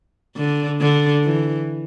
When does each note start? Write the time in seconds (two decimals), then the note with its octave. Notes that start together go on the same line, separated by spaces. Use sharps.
0.37 D3
0.81 D3
1.23 E3